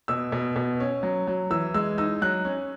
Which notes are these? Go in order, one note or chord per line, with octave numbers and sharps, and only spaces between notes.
B2 E6
B2
B2
C#4
F#3
F#3
E3 E6
G#3 E6
D#4 E6
F#3 F#6
C#4